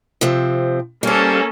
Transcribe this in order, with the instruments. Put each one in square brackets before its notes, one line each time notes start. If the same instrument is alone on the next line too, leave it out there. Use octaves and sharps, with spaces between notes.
[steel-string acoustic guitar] C3 F3 C4
[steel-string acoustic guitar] G3 C5 [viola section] A#3 C#4 A4